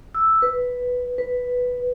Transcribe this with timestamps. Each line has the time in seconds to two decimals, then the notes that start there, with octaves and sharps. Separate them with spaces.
0.15 E6
0.42 B4
1.18 B4